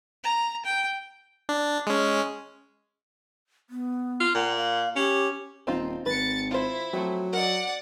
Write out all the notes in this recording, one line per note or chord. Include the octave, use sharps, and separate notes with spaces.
A#5
G5
D4
G#3 C#4
B3
F4
A#2 F#5
F5
C#4 G4
D#1 C4 D#4 F4
G#1 B4 A6 C#7
E4 F4 C5
F3 F#3 A3 C4
A#4 D5 D#5 F#5